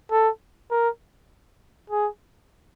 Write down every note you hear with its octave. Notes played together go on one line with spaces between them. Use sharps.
A4
A#4
G#4